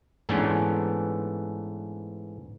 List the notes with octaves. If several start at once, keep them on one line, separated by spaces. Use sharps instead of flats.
G#2 E3 A3 B3 C#4 D4